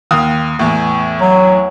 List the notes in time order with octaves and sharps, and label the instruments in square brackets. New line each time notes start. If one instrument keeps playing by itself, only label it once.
[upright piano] D#2 F5 D#6
E2 A2
[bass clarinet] F#3